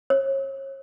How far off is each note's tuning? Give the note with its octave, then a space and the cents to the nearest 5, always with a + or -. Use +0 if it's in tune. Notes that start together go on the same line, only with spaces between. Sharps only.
C#5 -35